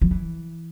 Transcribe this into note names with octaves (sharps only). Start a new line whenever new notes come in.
F3
E3